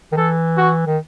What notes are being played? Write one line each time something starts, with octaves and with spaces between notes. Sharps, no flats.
D#3
E3 A4
F#4
D#3